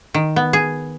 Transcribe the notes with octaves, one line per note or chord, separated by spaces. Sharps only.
D#3
B3
G#4